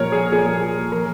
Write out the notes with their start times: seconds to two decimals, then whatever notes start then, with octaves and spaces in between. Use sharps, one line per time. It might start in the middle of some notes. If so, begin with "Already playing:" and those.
Already playing: A#2 F3 A#4 C#5
0.12 G#4
0.32 A#2 F3 G#4
0.92 F3 A#4